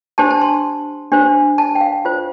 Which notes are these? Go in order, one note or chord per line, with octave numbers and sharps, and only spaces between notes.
D4 G4 C5 A5
A5
C6
D4 G4 C5
A5
G5
F5
F4 C5